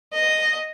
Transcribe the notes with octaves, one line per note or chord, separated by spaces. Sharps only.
D#5